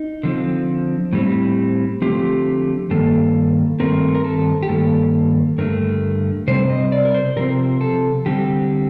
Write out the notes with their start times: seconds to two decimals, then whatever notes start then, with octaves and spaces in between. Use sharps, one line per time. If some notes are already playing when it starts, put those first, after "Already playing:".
Already playing: D#4
0.23 D3 F3 C4
1.13 A2 G3 C4
2.02 D3 F3 A3 C4 G4
2.90 G2 D#3 A#3 A4
3.80 G2 D#3 A3 C4 A#4
4.15 A#4
4.24 A4
4.63 G4
4.69 G2 D#3 A#3 A4
5.58 G2 D3 A3 A#4
6.48 C3 G3 C4 C5
6.70 D#5
6.92 D5
7.05 A#4
7.15 C5
7.36 C3 F3 C4 A#4
7.81 A4
8.26 D3 G3 C4 G4